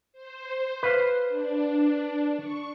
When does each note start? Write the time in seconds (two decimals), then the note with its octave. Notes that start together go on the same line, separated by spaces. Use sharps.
0.13 C5
0.83 B4 F5
1.28 D4
2.37 C#6